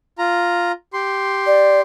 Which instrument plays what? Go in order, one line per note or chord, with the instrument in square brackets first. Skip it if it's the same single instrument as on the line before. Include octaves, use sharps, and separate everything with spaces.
[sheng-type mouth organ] F4 A#5
G4 C6
[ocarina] D5